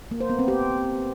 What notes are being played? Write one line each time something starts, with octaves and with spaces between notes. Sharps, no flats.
A#3
C5
B3
C4
G4